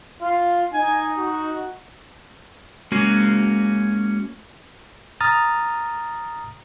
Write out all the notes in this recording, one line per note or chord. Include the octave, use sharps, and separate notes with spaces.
F4
D#4 G#5
F#4
G#3 A#3 C#4 F#4
A#5 D#6 F6 A6